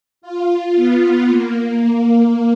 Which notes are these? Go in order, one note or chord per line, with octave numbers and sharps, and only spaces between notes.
F4
B3
A#3